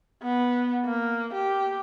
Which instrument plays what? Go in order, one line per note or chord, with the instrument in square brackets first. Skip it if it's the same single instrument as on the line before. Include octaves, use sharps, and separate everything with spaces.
[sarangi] B3
A#3
G4